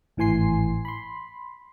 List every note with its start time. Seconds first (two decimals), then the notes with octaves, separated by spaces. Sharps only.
0.17 G#1 A2 E3 G#5 C6 C7
0.85 B5 C6